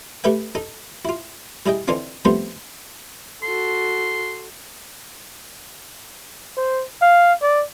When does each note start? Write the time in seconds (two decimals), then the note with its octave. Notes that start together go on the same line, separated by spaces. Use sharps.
0.24 A3 G4 A4 B4 E5 G5
0.55 D#4 A4
1.05 E4 F4
1.66 G3 E4 G#4 D#5 G5
1.88 D3 E3 C4 D4 D#4 F4
2.25 F3 G3 A3 B3 C4 C5
3.43 F#4 A4 C6
6.57 C5
7.02 F5
7.42 D5